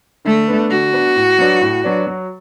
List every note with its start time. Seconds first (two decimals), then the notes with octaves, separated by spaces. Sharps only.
0.25 D3 A3
0.48 B3 D4 B4
0.70 D3 F#4
0.93 B3 D4 B4
1.16 A2
1.38 F#3 D4 B4 D5
1.61 A2
1.84 F#3 D4 B4 D5
2.07 F#3